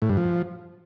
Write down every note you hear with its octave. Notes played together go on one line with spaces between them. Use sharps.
A2
G2
F3